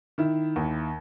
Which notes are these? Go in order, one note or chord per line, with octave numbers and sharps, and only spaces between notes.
D#3 E4
D#2